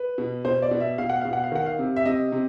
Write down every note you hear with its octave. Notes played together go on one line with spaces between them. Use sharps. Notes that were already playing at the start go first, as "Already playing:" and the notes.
Already playing: B4
B2
B2 C5
D5
B2
E5
B2 F5
F#5
B2 F5
F#5
F5
D#3 F#5
F5
C3
E5
C3 D#5
C3